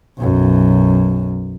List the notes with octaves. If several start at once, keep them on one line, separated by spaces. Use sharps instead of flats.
B1 F#2